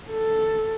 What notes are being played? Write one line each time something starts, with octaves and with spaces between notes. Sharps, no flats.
A4